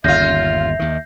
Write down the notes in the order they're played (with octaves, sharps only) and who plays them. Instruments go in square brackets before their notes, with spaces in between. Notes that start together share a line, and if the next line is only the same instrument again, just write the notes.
[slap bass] G1 D#2 [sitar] C#3 F4 [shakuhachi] E5 [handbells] G6 A#6 C7
[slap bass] D#2 D#3